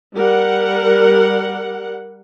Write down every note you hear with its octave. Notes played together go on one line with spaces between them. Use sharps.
G3 A#4 F#5